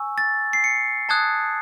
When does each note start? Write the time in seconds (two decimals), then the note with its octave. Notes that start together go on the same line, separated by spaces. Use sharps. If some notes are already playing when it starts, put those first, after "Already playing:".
Already playing: G#5 C#6 E6
0.18 A6
0.53 C7
0.64 C#7
1.09 A5 D#6 F#6 G#6